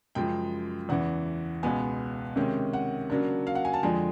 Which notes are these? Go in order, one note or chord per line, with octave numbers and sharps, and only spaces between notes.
F#2 C#3 F3 G#3 G5
E2 C#3 E3 F#5
C#2 B2 G#3 B3 G#5
C3 D#3 G#3 C#4
F#5
C#3 F#3 A#3 D4
F5
F#5
G#5
A5
F2 D3 F3 G#3 G#5